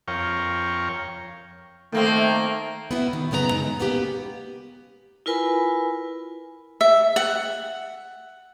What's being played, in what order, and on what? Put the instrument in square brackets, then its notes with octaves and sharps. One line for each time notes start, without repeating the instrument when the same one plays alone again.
[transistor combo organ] F2 A#4 C#5 F5 G5 C#6
[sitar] D#3 A#3 C4 [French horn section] A3
[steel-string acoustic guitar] B3 C#4 E4 F#4
D#3
F#2 C#3 B3 A#4 A#5
G#3 D#4
A#3 B3 C#4 G4
[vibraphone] E4 F4 A#4 B4 G#5 B5
[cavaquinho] E5
F#5